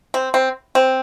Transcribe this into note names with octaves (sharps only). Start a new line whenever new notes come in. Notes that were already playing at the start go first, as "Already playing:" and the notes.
C4
C4
C4